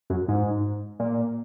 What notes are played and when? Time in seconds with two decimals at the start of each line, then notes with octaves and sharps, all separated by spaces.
0.10 F#2
0.28 G#2
0.99 A#2